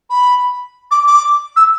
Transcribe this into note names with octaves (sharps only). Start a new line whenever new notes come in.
B5
D6
D6
E6